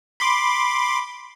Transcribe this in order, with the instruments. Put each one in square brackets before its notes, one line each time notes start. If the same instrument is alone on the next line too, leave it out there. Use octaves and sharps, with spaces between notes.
[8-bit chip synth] B5 C6 D6